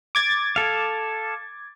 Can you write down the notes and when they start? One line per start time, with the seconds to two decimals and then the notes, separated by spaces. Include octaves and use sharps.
0.15 D6 G#6 A6
0.56 A4 F5